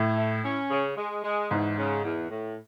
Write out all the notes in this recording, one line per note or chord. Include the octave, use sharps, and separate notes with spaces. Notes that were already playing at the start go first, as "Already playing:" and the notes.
Already playing: A2 A3
E4
C#4
C#3
G#3
G#3
E2 G#2
C#3
E2
A2